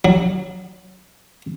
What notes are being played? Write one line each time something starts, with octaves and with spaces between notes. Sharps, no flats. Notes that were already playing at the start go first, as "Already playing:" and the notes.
F#3